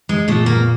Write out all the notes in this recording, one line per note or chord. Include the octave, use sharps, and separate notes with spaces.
G#3
A#2 A3
A#3